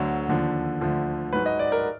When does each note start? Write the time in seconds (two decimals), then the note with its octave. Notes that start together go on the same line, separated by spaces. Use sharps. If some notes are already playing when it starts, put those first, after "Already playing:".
Already playing: D2 D3 F#3
0.29 D#2 D3 F3
0.81 D2 D3 F3
1.33 G#2 F#3 B4
1.46 D#5
1.59 D5
1.72 A#4